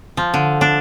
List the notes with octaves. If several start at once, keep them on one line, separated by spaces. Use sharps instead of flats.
F3
D3
D4